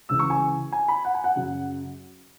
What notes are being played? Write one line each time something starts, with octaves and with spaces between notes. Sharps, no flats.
C#2 C#3 E3 E6
C#6
G#5
G#5
B5
F#5
G#5
F#5
F#2 C#3 F#3